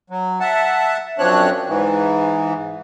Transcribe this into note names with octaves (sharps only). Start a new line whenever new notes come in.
F#3
E5 F#5 A5
F#2 F3 C4 D4 C#5 F#6
G#2 E3